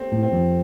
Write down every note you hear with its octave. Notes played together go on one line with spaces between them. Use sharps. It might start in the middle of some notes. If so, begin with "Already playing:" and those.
Already playing: A3 C4 G4
A2
C4
F2